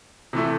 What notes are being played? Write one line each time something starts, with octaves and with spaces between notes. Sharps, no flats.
C3 E3 A3 E4